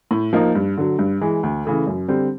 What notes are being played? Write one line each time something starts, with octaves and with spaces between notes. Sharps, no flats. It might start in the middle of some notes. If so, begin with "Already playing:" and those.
A2
F3 A#3 D#4
G2
D3 F#3
G2
E3 G#3
D2
C#3 E3 A3
F#2
D3 G3 C4